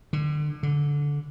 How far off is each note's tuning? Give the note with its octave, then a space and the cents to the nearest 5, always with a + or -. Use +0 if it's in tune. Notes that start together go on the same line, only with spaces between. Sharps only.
D3 +30
D3 -15